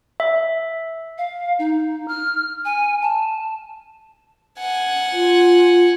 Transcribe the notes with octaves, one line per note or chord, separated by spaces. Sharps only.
E5
F5
D#4
F6
G#5
A5
F#5 G#5
F4